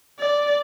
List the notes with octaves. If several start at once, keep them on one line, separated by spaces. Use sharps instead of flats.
D5